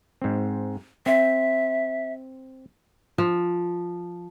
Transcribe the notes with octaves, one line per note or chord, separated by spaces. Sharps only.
G#2 C4
C4 C5 E5
F3